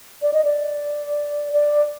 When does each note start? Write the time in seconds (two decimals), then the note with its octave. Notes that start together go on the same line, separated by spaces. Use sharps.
0.22 D5
0.33 D#5
0.45 D5
1.53 D5